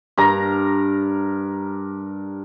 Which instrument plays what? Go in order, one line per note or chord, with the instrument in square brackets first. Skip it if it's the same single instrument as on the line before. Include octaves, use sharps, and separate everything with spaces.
[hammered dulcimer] G2 A#4 A#5